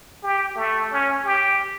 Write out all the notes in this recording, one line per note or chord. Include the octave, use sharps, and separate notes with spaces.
G4
A3
C#4
G4